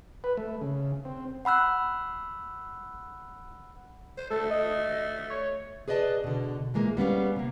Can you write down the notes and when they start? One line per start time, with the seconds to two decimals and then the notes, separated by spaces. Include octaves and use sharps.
0.24 B4
0.37 A3
0.61 C#3
1.05 C4
1.45 F#5 B5 E6 F#6
4.18 C5
4.30 A3 A4
4.50 D#5
5.30 C#5
5.88 G#4 B4 D5 D#5 A5
6.24 B2 D3
6.74 A#2 E3 G#3 A#3
6.97 G3 B3 C#4 F5
7.36 C3 A#3